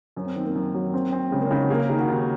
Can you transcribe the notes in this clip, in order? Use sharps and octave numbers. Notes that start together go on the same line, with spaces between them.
F#2 C#4
C4
D#3 C4
A#3
F#2
F#3
C4
C4
C#3 G#3
A#3
C#4
C#3 D#4
F#4
A#3 G#4
A#4
D#3 G#4
F#4
D#2